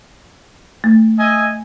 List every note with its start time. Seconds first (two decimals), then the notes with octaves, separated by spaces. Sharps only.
0.84 A3
1.19 D#5 E5 G#5